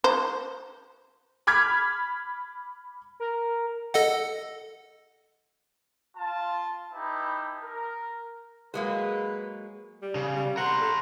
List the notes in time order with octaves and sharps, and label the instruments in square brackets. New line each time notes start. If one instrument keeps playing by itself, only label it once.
[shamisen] C5
[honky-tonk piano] B5 D6 F6 G#6 B6
[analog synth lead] A#4
[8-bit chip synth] A4 D#5 F#5
[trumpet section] F4 A5
D#4 E4 G4 B4 A5
A#4
[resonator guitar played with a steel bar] F#3 G#3 A#3 [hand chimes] G#4 [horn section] B4
[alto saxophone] G3
[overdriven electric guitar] C#3
[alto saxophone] G3
[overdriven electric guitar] A#4 C5 [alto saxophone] F#5
[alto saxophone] A4